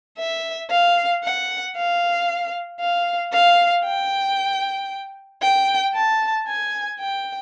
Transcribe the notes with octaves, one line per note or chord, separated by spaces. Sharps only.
E5
F5
F#5
F5
F5
F5
G5
G5
A5
G#5
G5